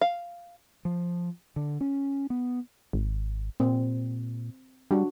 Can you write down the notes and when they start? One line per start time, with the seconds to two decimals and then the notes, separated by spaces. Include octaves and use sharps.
0.01 F5
0.85 F3
1.56 D3
1.81 C#4
2.30 B3
2.93 G#1
3.60 A#2 C4
4.91 G3 D4 F#4